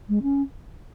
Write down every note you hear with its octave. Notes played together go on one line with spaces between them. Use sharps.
G#3
C#4